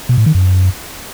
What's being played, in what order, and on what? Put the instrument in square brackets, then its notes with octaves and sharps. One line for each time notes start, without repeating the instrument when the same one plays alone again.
[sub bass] B2
A2
D#3
F#2